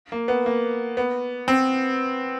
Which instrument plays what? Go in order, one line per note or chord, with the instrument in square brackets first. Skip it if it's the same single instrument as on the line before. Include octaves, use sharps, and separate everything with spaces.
[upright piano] A#3
B3
A#3
B3
C4